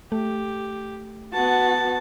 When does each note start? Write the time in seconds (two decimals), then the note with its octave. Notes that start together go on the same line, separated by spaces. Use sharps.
0.12 A3 G4
1.33 B3 F#4 A5